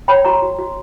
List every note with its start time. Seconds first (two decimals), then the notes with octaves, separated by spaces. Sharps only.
0.08 C#5 G5 B5
0.25 F#4 A#5 C#6
0.42 F#4
0.59 F#4